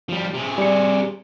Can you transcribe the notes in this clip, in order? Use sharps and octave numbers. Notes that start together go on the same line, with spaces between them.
F3 G3
C3 G#4
G3 C#7